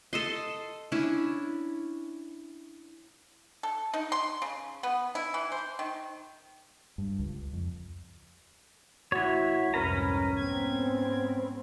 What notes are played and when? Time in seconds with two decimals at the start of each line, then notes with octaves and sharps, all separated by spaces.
0.13 A4 D#5 C6
0.92 C#4 D4 E4
3.63 A4
3.94 D#4
4.12 C6
4.42 C#3
4.83 B3
5.15 E4
5.34 E3
5.52 C5
5.79 D#3
6.98 G2
7.19 C#2
7.53 F2
9.12 A1 E4 F#4 C#5
9.74 C2 F2 G#2 C#4 A#4 B4 A#5
10.36 G#2 B3 C4 G#6